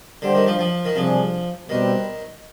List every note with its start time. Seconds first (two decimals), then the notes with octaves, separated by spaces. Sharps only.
0.22 D3 G3 D4 G4 C5
0.35 D#3
0.47 F3
0.59 F3
0.85 D#3
0.96 C3 F3 G3 D4 G#4
1.69 B2 D#3 G3 C4 G4 B4